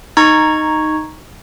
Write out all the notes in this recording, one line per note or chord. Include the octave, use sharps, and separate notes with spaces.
D#4 A#5 C#6 G#6